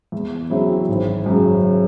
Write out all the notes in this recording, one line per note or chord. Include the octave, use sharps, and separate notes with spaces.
E2
C#3 F#3 C4 E4
G#1
F#2 C#3